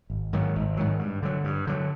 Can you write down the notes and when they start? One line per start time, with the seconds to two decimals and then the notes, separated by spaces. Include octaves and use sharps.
0.10 G#1
0.33 G#2 D#3 F#3
0.56 G#1
0.77 G#2 D#3 F#3
0.99 G2
1.22 D3 F#3
1.44 G2
1.67 D3 F#3